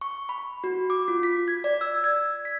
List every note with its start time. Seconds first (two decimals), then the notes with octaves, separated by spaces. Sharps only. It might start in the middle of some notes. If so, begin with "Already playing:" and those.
0.01 C#6
0.29 B5
0.64 F#4
0.90 D6
1.08 F4
1.23 B6
1.48 G#6
1.64 D5
1.81 E6
2.04 G#6
2.45 B6